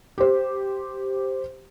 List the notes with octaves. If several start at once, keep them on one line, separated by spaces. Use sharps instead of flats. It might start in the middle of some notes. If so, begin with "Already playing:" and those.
G4 C5